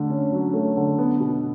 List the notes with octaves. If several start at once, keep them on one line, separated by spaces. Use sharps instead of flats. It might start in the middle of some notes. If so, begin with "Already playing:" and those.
Already playing: D3 A3
C#4
F#3
A3
D3
B3
B2